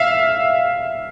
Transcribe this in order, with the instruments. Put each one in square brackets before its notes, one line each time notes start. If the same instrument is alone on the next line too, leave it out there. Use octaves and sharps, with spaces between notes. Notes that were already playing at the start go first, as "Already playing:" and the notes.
Already playing: [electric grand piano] E5 F5